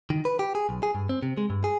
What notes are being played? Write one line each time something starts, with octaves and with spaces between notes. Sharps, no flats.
D#3
B4
G4
G#4
B1
G#4
G2
C4
C3
G#3
G2
G#4